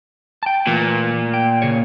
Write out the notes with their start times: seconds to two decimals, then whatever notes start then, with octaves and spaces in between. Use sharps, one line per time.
0.43 G5 A5
0.67 A#2 E3 A3
1.34 G5
1.62 C#3 G#4 C#5